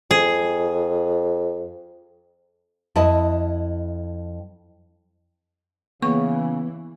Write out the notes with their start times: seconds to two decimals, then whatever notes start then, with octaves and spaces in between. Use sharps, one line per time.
0.11 F2 G#4
2.96 F2 E4 D#5 A5
6.02 C#3 E3 A#3 B3 C#6